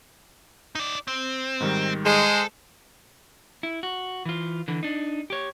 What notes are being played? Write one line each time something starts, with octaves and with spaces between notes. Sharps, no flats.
D#4 D5
C4
G#2 D#3 G3
G#3 A4 C5
E4
F#4
E3 F4
D3 E3
D4 D#4
G4 C#5